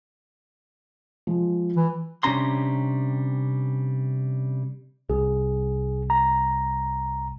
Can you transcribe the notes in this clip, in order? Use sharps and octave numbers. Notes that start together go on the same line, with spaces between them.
F3 G#3
E3
C3 G3 C#4 D4 A#5 C6
C2 G#4
A#5